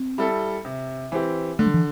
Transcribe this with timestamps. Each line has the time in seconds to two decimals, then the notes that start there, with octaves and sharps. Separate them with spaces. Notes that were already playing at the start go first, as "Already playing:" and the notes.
Already playing: C4
0.18 G3 E4 A4
0.65 C3
1.12 E3 C4 G4
1.59 D3 A3
1.66 G3
1.74 E3